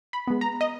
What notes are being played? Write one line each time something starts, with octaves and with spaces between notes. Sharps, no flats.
B5
G#3 B3
A#5
D#5